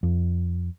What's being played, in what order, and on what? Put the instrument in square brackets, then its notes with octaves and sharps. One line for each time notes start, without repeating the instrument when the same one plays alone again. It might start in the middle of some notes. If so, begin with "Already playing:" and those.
[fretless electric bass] F2